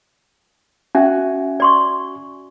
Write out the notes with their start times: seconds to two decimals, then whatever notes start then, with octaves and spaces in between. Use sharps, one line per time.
0.95 C#4 F#4 E5 G#5
1.60 D5 C6 C#6